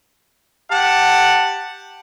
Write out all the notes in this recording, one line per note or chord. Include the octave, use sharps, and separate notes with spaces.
G4 F#5 A5